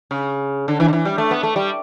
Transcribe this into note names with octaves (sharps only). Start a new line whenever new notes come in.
C#3
D3
E3
D3
E3
G3
A3
B3
A3
G3